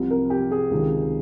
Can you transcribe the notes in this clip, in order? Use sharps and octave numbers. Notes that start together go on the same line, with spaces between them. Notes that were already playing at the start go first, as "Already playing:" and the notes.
Already playing: C2 C3 F3
A#4
G4
G#4
C#2 C3 D#3